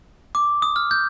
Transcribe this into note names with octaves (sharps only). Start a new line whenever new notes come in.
D6
D#6
F6
G6